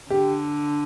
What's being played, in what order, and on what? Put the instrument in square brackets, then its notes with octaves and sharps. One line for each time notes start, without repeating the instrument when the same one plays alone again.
[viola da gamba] D3 [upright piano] G4